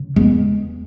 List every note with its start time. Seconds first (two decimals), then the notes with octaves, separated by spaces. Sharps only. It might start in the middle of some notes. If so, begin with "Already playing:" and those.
Already playing: C#3
0.16 E2 G#3 B3